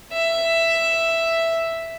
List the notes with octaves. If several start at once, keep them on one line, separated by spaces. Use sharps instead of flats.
E5